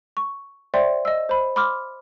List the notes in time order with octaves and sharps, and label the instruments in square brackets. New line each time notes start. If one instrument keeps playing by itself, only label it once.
[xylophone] C#6
C5 D5 E5 G5 C6
D#5 E6
C5 B5
B5 C6 D6 F6